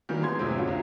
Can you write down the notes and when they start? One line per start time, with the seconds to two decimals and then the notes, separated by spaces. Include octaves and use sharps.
0.09 D#3 E3 F#3 G3 A#3
0.21 F#3 G#3 B3 C6 G#6
0.39 C2 F#2 A2 C3 G#3 C4
0.56 B2 D3 C#4 F4
0.68 C2